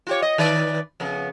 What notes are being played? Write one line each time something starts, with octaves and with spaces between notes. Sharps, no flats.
F4 G4 C#5
D#5
D#3 B4 D5
F2 C#3 B3